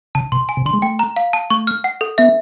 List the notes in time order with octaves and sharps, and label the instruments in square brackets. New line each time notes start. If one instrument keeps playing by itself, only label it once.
[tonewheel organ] C#3 [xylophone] A5
[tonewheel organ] B2 [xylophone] C6
[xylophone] G#5
[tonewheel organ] C3
[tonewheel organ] D3 [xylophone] C6
[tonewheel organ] G#3
[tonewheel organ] A3 [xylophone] G5
[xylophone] A#5
F5
A5
[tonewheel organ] A3 [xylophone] C#6
[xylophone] F6
F#5
A4
[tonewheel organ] B3 [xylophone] E5